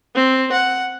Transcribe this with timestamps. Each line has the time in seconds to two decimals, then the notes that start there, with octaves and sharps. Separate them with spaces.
0.15 C4
0.52 F#5